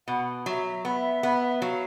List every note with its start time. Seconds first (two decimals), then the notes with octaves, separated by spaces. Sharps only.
0.08 B2 F#5
0.46 F#3 E5
0.65 E5
0.84 B3 E5
1.23 B3
1.61 F#3 F5